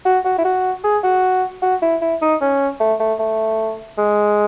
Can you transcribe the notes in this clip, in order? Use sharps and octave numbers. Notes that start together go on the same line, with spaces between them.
F#4
F#4
E4
F#4
G#4
F#4
F#4
E4
E4
D#4
C#4
A3
A3
A3
G#3